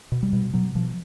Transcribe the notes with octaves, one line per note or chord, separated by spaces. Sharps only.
B2
G3
B2
B2 F#3
B2 F3